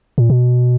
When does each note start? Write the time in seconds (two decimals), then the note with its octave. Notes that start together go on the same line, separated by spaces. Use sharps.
0.18 A#2
0.30 B2